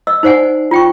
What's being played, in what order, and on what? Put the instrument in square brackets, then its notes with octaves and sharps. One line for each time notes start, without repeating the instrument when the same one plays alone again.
[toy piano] D#5 E6
D#4 C5 D5 F#5 G#5
F4 G5 C#6